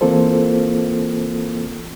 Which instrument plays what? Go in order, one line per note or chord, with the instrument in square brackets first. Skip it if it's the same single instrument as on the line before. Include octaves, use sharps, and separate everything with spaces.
[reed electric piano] E3 A#3 C4 F4 A4 C5